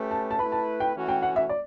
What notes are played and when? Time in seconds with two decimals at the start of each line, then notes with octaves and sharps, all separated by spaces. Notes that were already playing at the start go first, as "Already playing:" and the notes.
Already playing: A3 C#4 G4 B4
0.11 A5
0.31 A5
0.38 A3 E4 B4 B5
0.52 A5
0.80 G5
0.94 E3 A3 C#4 F#4
1.09 G5
1.22 F#5
1.36 E5
1.49 D5